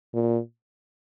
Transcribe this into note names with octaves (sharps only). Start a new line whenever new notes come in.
A#2